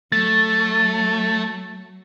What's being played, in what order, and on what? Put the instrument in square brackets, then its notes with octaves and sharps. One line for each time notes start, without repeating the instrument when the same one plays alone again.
[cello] F#3 [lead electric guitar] A3 [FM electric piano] A6